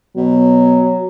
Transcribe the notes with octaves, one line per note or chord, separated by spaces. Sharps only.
B2 F#3